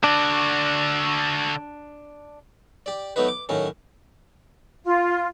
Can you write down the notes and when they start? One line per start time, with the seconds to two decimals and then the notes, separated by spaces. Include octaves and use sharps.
0.04 D3 D4 F#4
2.86 G4 D5
3.16 F#3 A3 B3 D#4 B4
3.28 D6
3.49 A2 D#3 F#3 C#4
4.84 F4